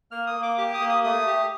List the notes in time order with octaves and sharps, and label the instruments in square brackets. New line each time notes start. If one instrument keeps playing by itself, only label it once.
[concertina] A#3 F6
D#6
A#3
D6
G4 D6
D#6
A#3
D#6
A3 D#6
G4